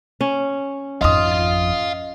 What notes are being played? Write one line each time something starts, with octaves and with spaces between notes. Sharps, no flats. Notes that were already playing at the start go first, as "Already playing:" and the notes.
C#4
G#1 F2 D#5 F5 C6 D#6